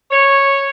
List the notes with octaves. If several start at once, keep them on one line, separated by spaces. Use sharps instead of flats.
C#5